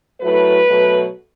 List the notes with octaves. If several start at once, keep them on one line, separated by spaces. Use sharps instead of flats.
A2 F#3 A3 B4
B2 F#3 A3